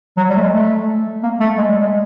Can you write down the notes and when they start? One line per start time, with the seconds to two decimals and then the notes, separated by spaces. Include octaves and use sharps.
0.17 F#3
0.30 G3
0.36 A3
0.41 G#3
0.52 A3
1.23 A#3
1.40 A3
1.58 G#3
1.69 G3
1.81 G#3